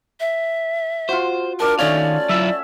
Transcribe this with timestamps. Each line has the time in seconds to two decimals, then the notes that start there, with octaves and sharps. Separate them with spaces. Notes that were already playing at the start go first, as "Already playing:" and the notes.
0.20 E5
1.09 F4 F#4 C5
1.60 D4 A#4 D5 A5
1.79 D#3 A3 C#4 D#4 D5 F5
2.29 F#3 E4 F4 E5